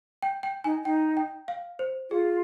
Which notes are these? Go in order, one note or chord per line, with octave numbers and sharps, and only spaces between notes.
G5
G5
D#4 G#5
D#4 G5
G5
F5
C5
F4 G#4